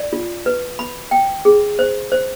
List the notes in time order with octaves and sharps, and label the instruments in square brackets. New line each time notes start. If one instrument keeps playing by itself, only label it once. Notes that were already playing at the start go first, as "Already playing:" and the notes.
Already playing: [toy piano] D5
F4
B4
B5
G5
G#4
C5
C5